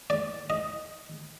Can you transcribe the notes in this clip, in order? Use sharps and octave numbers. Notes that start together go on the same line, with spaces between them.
D5
D#5